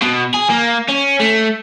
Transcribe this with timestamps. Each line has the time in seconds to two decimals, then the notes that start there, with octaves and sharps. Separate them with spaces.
0.02 B2
0.34 G#4
0.50 A#3
0.88 C#4
1.20 A3